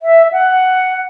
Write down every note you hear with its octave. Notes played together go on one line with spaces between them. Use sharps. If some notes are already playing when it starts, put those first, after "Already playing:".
E5
F#5